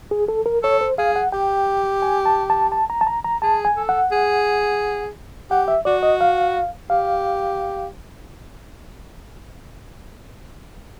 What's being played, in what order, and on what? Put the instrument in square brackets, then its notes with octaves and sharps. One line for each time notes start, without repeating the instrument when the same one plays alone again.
[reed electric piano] G#4
A4
A#4
[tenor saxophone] A4 [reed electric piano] C#5
[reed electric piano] C5
[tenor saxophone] G#4 [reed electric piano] F5
[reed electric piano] F#5
[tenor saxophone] G4 [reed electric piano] G5
[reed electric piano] G#5
A5
A5
A5
A#5
A5
A#5
A#5
[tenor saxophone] G#4 [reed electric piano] A5
[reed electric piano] G#5
[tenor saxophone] A4
[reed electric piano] F#5
[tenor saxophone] G#4
[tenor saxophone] G4 [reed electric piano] F#5
[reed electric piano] E5
[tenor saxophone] F#4 [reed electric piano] D5
[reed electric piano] D#5
F5
[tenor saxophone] G4 [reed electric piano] F5